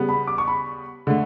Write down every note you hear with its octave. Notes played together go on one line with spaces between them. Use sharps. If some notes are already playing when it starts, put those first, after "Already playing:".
Already playing: C#3 G3 B3
B5
D6
C#6
B5
D3 A3